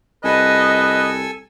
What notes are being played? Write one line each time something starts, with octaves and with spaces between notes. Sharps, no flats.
C2 A4 B4 D#5 G#5 E6